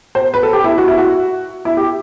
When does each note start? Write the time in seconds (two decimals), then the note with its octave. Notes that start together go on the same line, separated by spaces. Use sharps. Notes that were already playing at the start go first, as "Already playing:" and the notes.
0.15 C5
0.34 B4
0.43 A4
0.53 G4
0.64 E4
0.78 F#4
0.88 E4
0.98 F#4
1.65 E4
1.77 G4